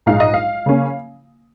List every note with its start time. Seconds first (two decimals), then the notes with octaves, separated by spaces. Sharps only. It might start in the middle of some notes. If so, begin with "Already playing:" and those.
0.06 A#1 G#2 G#3 D#4 F5
0.20 D#5
0.34 F5
0.66 C#3 A#3 C#4